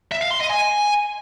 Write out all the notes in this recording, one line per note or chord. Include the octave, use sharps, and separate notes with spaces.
E5
F5
C6
D#5
G#5